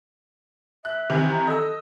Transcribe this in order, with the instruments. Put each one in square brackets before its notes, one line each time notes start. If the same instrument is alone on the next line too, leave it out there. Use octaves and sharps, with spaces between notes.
[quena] E5 [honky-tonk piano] F#6
[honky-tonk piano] C3 D#3 E3
[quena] A#5
[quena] A4 [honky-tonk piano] D#5 E6